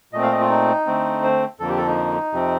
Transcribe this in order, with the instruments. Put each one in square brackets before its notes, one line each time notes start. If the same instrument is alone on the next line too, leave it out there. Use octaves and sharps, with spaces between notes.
[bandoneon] A#2 A3 C4 D#5
F5
D#5
F4
D#4
D3 A3 C4
C5
F2 D3 F3 A#3 A4
G4
A4
D#4
F2 C3 F3 C4